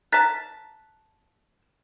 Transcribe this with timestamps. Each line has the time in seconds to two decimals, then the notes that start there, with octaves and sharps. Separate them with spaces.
0.12 A#4 A5 F#6 A6 B6